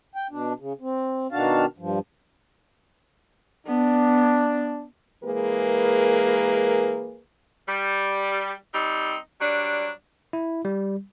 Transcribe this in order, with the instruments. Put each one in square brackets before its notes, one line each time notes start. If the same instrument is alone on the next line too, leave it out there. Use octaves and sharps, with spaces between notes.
[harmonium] G5
B2 D4
C#3
C4
B2 D#3 D4 F#4 F5 A5
G2 F3
[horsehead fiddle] B3 [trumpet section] D4
[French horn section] E3 G#3 A#3 G#4 A#4 B4
[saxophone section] G3
G3 C4 D#4
F#3 G3 D4
[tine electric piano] E4
G3